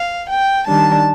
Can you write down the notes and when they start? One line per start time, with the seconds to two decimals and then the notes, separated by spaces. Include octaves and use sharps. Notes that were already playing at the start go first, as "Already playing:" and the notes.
Already playing: F5
0.28 G5
0.67 D#3 G3 D4 A5